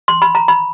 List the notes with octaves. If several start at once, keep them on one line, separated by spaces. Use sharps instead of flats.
C6
B5
A#5
B5